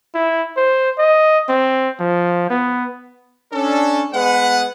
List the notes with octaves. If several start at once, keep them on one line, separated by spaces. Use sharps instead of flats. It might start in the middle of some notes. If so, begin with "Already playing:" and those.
E4
C5
D#5
C4
F3
B3
C#4 D4 A4
G#3 B3 B4 F#5